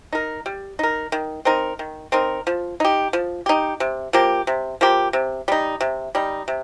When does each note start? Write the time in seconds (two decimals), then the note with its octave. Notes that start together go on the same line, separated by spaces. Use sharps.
0.12 D#4 A#4
0.46 G3
0.79 D#4 A#4
1.12 D#3
1.45 C4 D#4 A#4
1.79 D#3
2.12 C4 D#4 A#4
2.47 F3
2.80 D#4 G4
3.13 F3
3.46 D#4 G4
3.80 C3
4.13 F3 A#3 G4
4.47 C3
4.81 F3 A#3 G4
5.13 C3
5.48 G3 D#4
5.81 C3
6.15 G3 D#4
6.48 C3